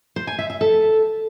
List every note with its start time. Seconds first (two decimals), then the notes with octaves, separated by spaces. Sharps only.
0.16 C5
0.27 G#5
0.39 E5
0.50 E5
0.61 A4